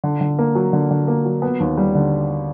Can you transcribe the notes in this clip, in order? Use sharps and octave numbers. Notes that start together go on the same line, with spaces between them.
D3
D3
A#3
F#3
D3
D3
A#3
F#3
B3
D#2
G3
D3